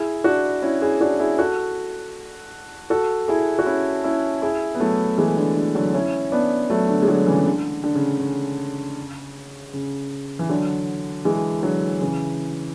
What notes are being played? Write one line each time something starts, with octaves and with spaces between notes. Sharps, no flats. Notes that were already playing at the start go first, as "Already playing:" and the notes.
Already playing: E4 G#4
D4 F#4
C#4 E4
E4 G#4
D4 F#4
E4 G#4
F#4 A4
F#4 A4
E4 G#4
F#4
C#4 E4
C#4 E4
E4 G#4
B3
F#3 A3
E3 G#3
D3
D3
D3 F#3
C#4 E4
B3 D4
F#3 A3
D3
G#3
D3 F#3
C#3 E3
C#3
D3
D3
C#3
C#3
C#3
E3
D3 F#3
E3 G#3
D3 F#3
C#3 E3